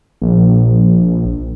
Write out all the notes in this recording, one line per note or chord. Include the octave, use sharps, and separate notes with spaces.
A#1